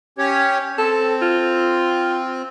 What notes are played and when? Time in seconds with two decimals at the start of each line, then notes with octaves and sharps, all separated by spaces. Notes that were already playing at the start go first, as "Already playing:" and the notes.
0.18 C#4 G4 C#5
0.78 C4 A4
1.22 F4